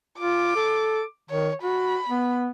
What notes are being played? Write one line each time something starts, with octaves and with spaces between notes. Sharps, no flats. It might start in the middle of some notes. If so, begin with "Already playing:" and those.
F4 D6
A4
D#3 C#5
F#4 B5
B3